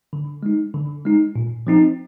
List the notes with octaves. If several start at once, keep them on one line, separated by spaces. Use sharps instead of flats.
D3
G#3 D#4
D3
G#3 D#4
A#2
F3 C4 D#4